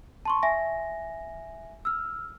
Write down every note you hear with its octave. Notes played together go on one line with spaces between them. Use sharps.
A5 C6 C#6
E5 G#5 A#6
E6 F6